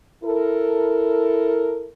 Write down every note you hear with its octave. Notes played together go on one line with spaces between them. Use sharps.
E4 A4 A#4